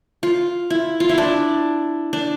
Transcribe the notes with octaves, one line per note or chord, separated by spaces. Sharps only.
F4
E4
F4
E4
D4
D4